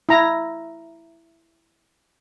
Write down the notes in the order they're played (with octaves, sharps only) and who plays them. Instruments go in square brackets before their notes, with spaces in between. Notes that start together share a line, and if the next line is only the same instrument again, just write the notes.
[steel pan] E4 A#5